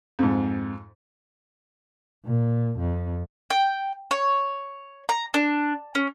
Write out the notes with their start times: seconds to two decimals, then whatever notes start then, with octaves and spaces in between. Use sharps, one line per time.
0.19 F2 G#2
2.25 A#2
2.80 F2
3.50 G5
4.11 C#5
5.09 A#5
5.34 D4
5.95 C#4